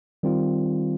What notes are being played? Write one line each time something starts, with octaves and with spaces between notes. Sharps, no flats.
D#3 G3 C4 F4